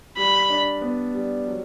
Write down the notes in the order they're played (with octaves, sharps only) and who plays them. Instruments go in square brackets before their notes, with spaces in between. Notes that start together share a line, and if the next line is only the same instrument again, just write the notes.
[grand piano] G3 [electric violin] B5
[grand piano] D4
B3
G3
F#3